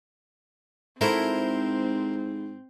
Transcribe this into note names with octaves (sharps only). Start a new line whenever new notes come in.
G#2 C4 E4 F#4 A4 A#4 C5